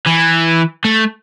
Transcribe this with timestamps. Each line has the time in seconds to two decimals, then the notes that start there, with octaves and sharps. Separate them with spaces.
0.07 E3
0.85 A3